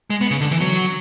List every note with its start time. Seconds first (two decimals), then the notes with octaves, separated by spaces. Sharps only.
0.10 G#3
0.21 B3
0.31 C#3
0.41 D3
0.51 E3
0.61 F#3